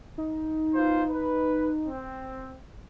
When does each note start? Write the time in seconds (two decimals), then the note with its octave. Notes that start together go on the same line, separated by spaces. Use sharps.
0.18 D#4
0.74 B3 F4 C5
1.09 B4
1.85 C4